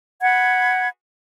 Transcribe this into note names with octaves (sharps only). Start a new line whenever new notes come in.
F#5 B5 G#6